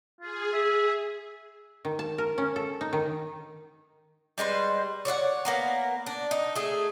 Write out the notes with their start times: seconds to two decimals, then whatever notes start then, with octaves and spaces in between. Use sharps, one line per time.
0.21 F4 G#4
0.53 E5
1.85 D#3
1.99 A5
2.18 A#4
2.38 C#4
2.56 A4
2.81 D#4
2.93 D#3
4.38 G3 G#3 B4 C5
5.05 C#5 D5 F5 F#5
5.45 A#3 B3 A#4
6.06 D4
6.31 D#4
6.56 A3 G#4